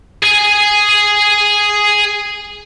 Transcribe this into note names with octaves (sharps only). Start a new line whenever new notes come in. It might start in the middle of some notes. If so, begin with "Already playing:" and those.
G#4 G#5